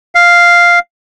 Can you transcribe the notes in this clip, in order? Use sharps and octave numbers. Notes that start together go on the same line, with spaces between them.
F5